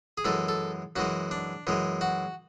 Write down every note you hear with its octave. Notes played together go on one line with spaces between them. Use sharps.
G#4
F#2 E3 G#3 A4
A4
F#2 E3 G#3 F#4
D4
F#2 E3 G#3
F#4